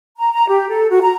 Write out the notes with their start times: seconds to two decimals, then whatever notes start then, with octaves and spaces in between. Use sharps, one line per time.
0.19 A#5
0.32 A#5
0.47 G4
0.70 A4
0.90 F#4
1.02 A#5